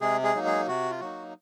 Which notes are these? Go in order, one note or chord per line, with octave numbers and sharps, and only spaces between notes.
C3 G#3 G#4
G#3 G#4
F#3 A#3 D#4
G#3 G#4
C3 F#4
F4
F#3 A#3 D#4 F#4